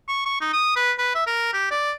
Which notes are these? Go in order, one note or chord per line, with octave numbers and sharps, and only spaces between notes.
C#6
C#6
D#4
D#6
B4
B4
E5
A#4
G4
D5